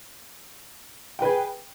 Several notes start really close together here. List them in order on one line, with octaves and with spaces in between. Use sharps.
G5 B4 G#4